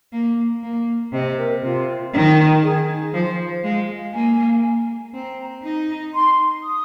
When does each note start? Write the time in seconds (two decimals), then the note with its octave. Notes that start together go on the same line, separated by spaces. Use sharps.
0.13 A#3
0.63 A#3
1.13 C3 D#5
1.38 A#4
1.63 C3 F4
2.14 D#3
2.63 G#4
3.14 F3 C5
3.64 G#3 F5
4.14 A#3 G#5
5.14 C4 A#5
5.64 D#4
6.14 C6
6.63 D#6